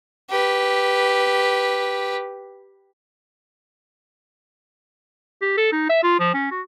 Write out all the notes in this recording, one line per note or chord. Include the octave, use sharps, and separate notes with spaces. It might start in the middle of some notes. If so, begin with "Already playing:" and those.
G4 B4
G4
A4
D#4
E5
F4
F3
C#4
F#4